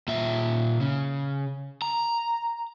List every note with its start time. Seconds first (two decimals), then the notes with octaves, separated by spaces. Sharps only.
0.08 A#2 E5
0.81 C#3
1.82 A#5